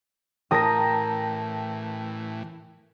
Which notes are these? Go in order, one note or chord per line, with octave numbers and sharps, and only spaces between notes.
A2 E3 A#4 G5 A5 D#6 A#6